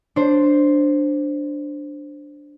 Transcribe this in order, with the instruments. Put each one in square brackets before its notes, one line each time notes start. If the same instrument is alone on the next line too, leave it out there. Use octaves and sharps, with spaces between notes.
[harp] D4 C5